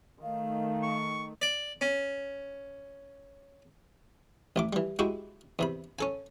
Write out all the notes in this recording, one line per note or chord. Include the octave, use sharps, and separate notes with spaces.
D#3 A3 F5
C#6
D5
C#4
A1 A2 D6
E3 G3
G#3 E4 F#4 G4
E2 C3 B5
C#4 A4 G#5